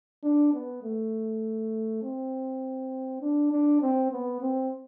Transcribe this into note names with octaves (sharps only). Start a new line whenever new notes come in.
D4
B3
A3
C4
D4
D4
C4
B3
C4